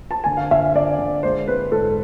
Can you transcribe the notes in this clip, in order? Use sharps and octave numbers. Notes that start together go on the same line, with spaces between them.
A5
D3 G#5
F5
D3 E5
D3 D5
D3
G#3 C5
C4 B4
G#2 A4